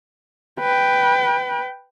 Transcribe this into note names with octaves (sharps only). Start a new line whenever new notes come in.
B4 G5